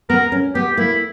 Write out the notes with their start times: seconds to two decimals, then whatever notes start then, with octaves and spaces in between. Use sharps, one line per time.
0.10 B3 A#4
0.32 C#4
0.55 B3 G4
0.77 A#3 E4